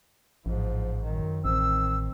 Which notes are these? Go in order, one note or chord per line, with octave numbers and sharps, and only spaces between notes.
A1 G#2 F3
F#2 D#3
A1 D#3 C4 E6